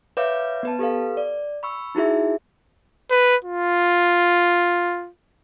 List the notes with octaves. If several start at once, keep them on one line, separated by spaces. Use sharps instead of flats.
B4 C#5 E5 F5 D6 G6
B3 B4 A5
G4 A4 B4 F5
D5
B5 C#6 E6
D#4 E4 F#4 G#4 E5
B4
F4